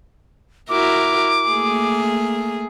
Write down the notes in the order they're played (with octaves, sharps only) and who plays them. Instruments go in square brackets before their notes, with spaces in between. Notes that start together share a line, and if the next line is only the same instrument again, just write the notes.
[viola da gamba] E4 F#4 A#4 [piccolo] D6
[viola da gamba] A3 A#3 G#4